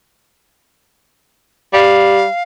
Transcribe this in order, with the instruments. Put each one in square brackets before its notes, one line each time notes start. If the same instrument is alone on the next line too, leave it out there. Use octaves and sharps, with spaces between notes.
[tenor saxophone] G3 [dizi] F5